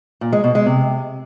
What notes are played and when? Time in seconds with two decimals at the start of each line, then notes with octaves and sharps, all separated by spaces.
0.21 A#2
0.33 G#3
0.44 B2
0.55 G#3
0.66 C3